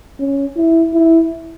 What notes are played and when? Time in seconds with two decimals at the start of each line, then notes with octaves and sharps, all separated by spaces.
0.19 C#4
0.57 E4
0.94 E4